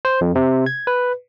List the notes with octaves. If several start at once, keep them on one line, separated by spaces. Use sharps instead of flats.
C5
F2
C3
G#6
B4